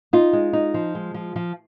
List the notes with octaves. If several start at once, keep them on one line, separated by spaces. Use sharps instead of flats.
D#4 F4
G#3
D#4
F3
G#3
F3
F3